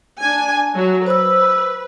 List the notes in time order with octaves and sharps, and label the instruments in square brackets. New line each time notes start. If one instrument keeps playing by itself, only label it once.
[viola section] D4 G#5
F#3 F#4
[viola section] B4 [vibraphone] C5 E6